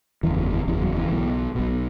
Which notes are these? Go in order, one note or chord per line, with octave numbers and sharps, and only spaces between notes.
F#1 E2 C#3 E3
E3
F#1 E2 C#3 E3
F#3
E3
B1 B2
B1 B2